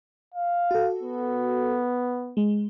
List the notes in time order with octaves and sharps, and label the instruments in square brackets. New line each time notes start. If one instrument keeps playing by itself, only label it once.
[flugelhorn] F5
[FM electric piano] F#4 A4
[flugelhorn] B3
[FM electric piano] G#3